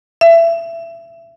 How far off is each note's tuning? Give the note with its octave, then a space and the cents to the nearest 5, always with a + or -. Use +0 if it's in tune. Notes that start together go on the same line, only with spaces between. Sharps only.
E5 +25